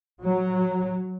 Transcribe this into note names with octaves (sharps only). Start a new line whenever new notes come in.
F#3